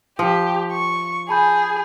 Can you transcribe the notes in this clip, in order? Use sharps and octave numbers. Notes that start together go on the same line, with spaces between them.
F3 G4
C#6
G#4 A5 B5 G6